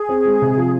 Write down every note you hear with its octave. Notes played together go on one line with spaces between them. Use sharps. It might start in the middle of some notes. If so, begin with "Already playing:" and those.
Already playing: G#4
C4
G#3
C3
F3